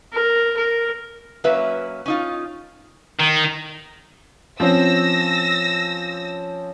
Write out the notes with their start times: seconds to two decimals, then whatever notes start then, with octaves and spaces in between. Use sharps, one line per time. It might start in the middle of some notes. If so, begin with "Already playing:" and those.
0.13 A#4
0.57 A#4
1.44 F#3 A#3 C#4 B4 E5
2.06 C#4 D#4 F4
3.20 D#3
4.60 F3 C4 C#4 E6 A#6